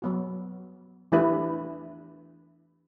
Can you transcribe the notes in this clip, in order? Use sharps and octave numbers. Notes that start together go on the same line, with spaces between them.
F#3 B3 F#4
E3 A3 D4 E4 G4 B4